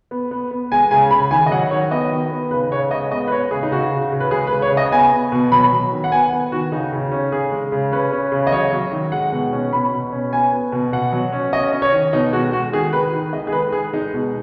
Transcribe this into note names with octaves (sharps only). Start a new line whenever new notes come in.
B3
B3
B3
G#3 G#5
C#3 G#5
C#3 B5
D#3 G#5
D#5
F#3 F#5
D#3 C#5
B3 D#5
D#3
B3
C#3 B4
C#3 C#5
G#3 D#5
B3 D#5
B4
G#3 C#5
C#3 G#4
D#4
C#3 F#4
C#3
C#3
B4
G#3 G#4
B4
C#3
C#5
C#3
D#5
B3 G#5
B3
B2
F#3 B5
F#3
D#3
F#5
B3 G#5
B3
D#3 F#4
C#3 D#4
C#3
C#4
C#3 G#4
G#3
C#3
C#4 B4
C#4
C#3
D#5
F#3 C#5
F#3
D#3
G#3 F#5
B2
C#4
B2 B5
B2
C#4
B3 G#5
B3
B2
B2 F#5
F#3
C#4
C#4 D#5
C#4
C#5
D#3
B2 D#4
G#3 F#4
G#3 F#4
D#3 G#4
D#3 B4
D#3
G#3 D#5
G#4
G#3 B4
G#3 G#4
G#3 D#4
B2